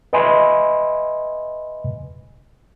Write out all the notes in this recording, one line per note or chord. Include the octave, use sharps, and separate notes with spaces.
B4 D#5 E5 G#5 B5 C6